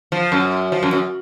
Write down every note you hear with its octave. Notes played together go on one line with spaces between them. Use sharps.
F3
F#2
F3
F#2
F#2